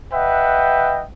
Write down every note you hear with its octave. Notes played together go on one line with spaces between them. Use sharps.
B4 D#5 E5 F#5 G5